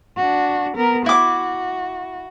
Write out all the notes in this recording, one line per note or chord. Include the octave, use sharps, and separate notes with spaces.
D4 F#4
B3 A#4
E4 F#4 D6